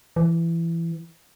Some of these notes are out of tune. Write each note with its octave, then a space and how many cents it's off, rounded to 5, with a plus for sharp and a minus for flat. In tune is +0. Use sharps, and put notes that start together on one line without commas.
E3 +20